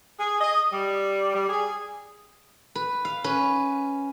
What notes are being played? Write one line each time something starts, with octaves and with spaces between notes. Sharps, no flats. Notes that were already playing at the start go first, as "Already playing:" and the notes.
G#4
D#5
G3
G3
G#4
B4
F5
C#4 B4